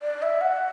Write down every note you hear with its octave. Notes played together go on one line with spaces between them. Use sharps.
D5
E5
F#5